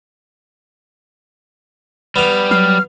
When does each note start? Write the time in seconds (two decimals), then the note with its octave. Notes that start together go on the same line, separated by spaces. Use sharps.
2.16 G3 B3 F5
2.51 F#3 F6